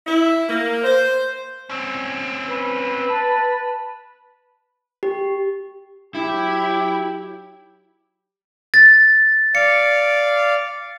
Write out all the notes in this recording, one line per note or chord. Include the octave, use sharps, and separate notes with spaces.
E4
A#3
C5
C4 C#4
B4
A5
G4
F#3 E4 G4
A6
D5 F5 C#7